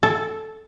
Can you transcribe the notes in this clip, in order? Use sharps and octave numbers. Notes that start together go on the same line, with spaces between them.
A4